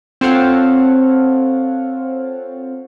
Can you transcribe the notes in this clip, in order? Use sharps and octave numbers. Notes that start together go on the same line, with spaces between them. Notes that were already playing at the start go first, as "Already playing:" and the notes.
C4 F4 A4 C#5 F5 F#5